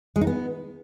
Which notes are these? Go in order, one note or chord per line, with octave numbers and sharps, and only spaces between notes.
G#3
D#4
B3